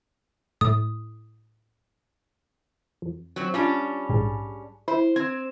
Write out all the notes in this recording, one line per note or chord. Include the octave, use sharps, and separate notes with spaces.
A2 D#6
F2
F#3 C4
G3 C#4 D4 F4
A#1 G#2 G#4
E4 C5
C4 G#6